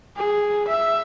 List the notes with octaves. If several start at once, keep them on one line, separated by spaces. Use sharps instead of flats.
G#4
E5